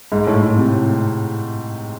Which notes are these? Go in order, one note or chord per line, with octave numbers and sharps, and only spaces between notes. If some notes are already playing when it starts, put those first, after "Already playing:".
G#2
A2
A2
C3